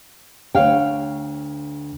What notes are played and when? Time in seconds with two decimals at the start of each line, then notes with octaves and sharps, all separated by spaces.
0.55 D2 G#2 C#5 F5 G5